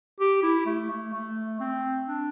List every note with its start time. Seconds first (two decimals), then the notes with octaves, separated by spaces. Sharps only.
0.20 G4
0.43 E4
0.66 A3
0.90 A3
1.13 A3
1.60 C4
2.08 D4